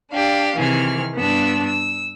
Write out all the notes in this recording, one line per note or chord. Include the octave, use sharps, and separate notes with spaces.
D4 G4 F5
C3 D#3 E3 G#4 F6
G2 B3 D4 E6
E6